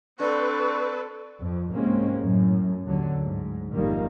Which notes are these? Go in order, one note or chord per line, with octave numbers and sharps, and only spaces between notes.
C4 D4 A4 B4 C#6
F2
C2 G#2 G#3 A#3 C4 C#4
F#2 A2
D#2 D3 F#3
D2 G#2
G#1 F2 D#3 G3 A#3